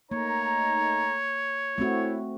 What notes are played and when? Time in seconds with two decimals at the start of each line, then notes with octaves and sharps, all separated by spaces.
0.11 A3 A#3 D#4 C#5 A#5
1.78 A3 C4 E4 F#4